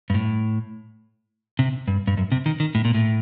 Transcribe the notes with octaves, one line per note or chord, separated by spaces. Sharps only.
G2
A2
C3
G2
G2
F#2
C3
D#3
D#3
A2
A#2
A2